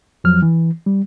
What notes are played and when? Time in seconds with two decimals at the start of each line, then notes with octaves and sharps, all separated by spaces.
0.24 F2 F3 F#3 F6
0.42 E3
0.86 G3